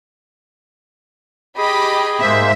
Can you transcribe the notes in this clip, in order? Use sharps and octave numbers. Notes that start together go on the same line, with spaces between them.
G4 G#4 D#5 B5
G#2 G#3 A#3 C5 E5